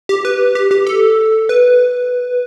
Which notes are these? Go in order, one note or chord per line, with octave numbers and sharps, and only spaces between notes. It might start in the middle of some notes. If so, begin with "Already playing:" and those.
G4
B4
G4
G4
A4
B4